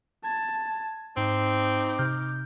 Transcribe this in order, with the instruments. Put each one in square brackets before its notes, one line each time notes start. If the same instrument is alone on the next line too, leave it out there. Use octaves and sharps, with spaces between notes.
[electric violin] A5 [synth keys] G#6
[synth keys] G#2 [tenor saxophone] C4 [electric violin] D#4 D6
[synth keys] C3 F6 G6